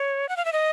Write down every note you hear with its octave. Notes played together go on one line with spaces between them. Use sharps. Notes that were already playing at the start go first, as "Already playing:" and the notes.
Already playing: C#5
F#5
F5
E5
D#5